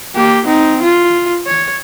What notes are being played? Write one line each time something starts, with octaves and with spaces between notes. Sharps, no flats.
A#3 G4
C4 D#4
F4
C#5